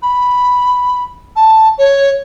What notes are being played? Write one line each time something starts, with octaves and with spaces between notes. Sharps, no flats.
B5
A5
C#5